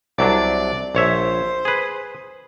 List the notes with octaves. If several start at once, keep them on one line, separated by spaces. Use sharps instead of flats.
C2 F#3 D4 D5
A#1 C5 C#5 E5
G#4 B4